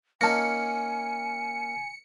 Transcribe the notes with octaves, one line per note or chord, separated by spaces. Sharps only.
A#3 C#4 D#4 G#5 A5 A#6 C#7